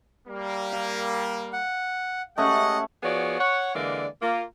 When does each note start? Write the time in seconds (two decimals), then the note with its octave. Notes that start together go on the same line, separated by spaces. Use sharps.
0.28 G3 A#3
0.72 F5
1.53 F#5
2.38 G#3 A3 C#4 G4 D#5 E5 F#5
3.03 F3 B3 F#4 G#4 C#5 D5
3.39 C#5 F#5
3.75 D3 E3 G#3 A#3 D5
4.22 A#3 F4